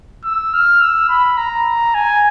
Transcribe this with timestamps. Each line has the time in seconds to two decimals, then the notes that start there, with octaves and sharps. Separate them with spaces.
0.24 E6
0.54 F6
0.82 E6
1.09 B5
1.37 A#5
1.95 G#5